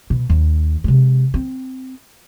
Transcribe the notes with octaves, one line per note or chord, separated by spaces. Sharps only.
B2
D#2
C3 G#3
C4